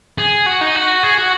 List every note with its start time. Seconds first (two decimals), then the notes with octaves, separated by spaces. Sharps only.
0.18 G#4
0.46 F#4
0.61 D#4
0.75 F#4
1.03 G#4
1.18 F#4